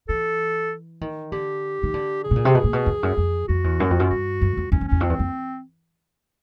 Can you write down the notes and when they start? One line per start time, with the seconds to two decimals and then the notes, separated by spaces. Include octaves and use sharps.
0.08 E3 A4
1.01 D#3
1.32 D3 G4
1.83 D#3
1.94 D3
2.24 G#4
2.31 B2
2.36 A#2
2.45 C3
2.55 B2
2.64 A#2
2.73 B2
2.86 F2
3.03 F#2
3.17 F2
3.48 F2 F#4
3.64 E2
3.80 F#2
3.90 F2
4.00 F#2 F4
4.10 G2 F#4
4.41 F#2
4.57 F2
4.72 E2 C#4
4.81 F2
4.88 E2 C#4
5.00 F2 C4
5.09 E2
5.19 F2